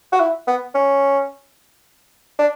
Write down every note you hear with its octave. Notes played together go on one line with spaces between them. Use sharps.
F#4
E4
B3
C#4
D4